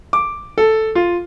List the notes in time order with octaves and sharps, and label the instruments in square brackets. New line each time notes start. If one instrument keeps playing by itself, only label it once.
[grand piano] D6
A4
F4